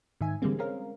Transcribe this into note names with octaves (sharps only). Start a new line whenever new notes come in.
G#2 D#3 E5 G#5
D3 E3 G3 G#3 A#3 C4
G#3 C4 C#4 A#4 F5